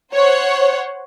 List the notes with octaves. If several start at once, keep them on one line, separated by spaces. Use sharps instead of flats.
C5 C#5 F#5